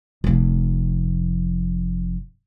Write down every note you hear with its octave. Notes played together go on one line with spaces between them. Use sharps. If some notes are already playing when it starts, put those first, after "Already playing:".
F1 F2